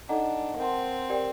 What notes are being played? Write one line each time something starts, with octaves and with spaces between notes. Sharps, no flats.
D4 D#4 A4 D#5 F#5 A#5
A#3
C4 A#4 F#5 A5 C6
G4 A#4 D5 G5